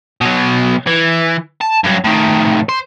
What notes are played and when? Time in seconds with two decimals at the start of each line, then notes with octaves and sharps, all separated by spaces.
0.21 B2 F#3
0.87 E3
1.61 A5
1.84 G2 F#3
2.04 A2 D#3
2.69 C5